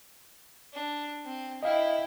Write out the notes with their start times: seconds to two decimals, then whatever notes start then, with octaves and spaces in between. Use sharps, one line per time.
0.73 D4
1.25 C4
1.63 E4 D#5 F5 G5